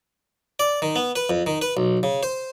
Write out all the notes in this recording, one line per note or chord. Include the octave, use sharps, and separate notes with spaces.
D5
D#3
B3
B4
F2
D#3
B4
B1
C#3
C5